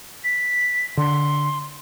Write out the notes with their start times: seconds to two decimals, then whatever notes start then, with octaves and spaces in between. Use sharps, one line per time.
0.24 B6
0.97 D3 C6